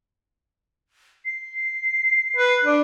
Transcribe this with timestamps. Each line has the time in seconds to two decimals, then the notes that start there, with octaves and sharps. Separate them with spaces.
1.25 C7
2.37 B4
2.64 D4